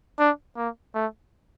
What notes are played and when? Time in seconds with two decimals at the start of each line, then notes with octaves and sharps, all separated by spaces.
0.19 D4
0.57 A#3
0.95 A3